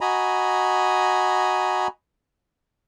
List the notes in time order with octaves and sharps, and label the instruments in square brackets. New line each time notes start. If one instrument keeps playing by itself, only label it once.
[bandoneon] F#4 D#5 G#5 A#5 B5